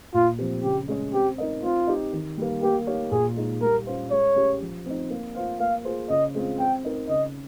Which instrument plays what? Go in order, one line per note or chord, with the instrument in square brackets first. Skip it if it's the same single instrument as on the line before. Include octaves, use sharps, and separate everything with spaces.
[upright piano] A#2 [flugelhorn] F4
[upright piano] F3 C4 G4
[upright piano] C#3 [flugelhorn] G4
[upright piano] G#3 C#4 G#4 C#5
[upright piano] C4 [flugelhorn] G4
[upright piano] D#4 A#4 D#5
[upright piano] C4 [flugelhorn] F4
[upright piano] D#4 G4
D#3
G3 A#3
[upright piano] A#3 [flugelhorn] G4
[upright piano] D#4 G4 C#5 F5
[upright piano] A#2 [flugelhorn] G#4
[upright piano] G#3 D#4
[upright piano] G3 [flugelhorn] A#4
[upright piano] C#4 F4 C5 F5
[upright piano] G#3 [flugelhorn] C#5
[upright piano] C#4 G4
F3
C4 D#4
A#3
F4 C5 F5
[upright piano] A#3 [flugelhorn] F5
[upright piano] F4 G#4 C5
[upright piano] C#3 [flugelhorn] D#5
[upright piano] G#3 C4 F4
[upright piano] C4 [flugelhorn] G5
[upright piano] D#4 A#4
[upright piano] C#3 [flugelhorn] D#5